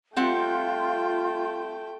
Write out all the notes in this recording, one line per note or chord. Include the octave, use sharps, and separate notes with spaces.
G3 A3 C4 F4 F#5 G5